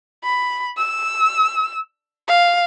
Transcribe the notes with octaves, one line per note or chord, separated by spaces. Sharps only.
B5
E6
F5